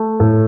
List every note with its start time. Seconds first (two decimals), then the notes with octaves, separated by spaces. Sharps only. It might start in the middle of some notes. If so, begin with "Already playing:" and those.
Already playing: A3
0.20 A2